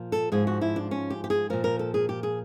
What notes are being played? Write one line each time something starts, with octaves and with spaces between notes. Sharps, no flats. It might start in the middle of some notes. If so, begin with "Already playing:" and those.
Already playing: A#2 F3
A4
G#2 F3 G#4
F#4
E4
D4
C#4
G4
G4
G#4
A#2 F3 A#4
A#4
A4
G#4
G4
G#4